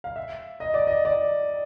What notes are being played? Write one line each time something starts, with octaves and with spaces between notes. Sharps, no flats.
F5
E5
D#5
D5
D#5
D5